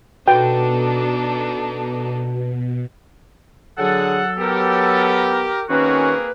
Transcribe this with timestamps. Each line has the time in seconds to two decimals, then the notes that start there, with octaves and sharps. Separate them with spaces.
0.28 B2 D4 D#4 F#4 A4 B4 G5
3.78 D3 F#3 G#4 A4 F#5
4.39 B3 G4 A#4
5.69 D#3 A#3 C4 C#4 F#4 G#4 B4